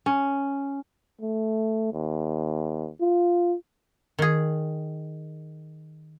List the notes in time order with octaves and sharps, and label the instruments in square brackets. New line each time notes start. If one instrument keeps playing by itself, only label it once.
[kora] C#4
[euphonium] A3
D#2
F4
[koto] D#3 G#4